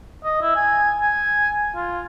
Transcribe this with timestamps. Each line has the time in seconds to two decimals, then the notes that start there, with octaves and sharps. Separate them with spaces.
0.24 D#5
0.42 E4
0.56 G#5
1.01 G#5
1.75 F4